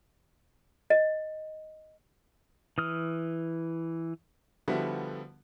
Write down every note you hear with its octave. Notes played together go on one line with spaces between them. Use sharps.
D#5
E3 D#6 F6
D3 F3 G3 B3 E4 F#4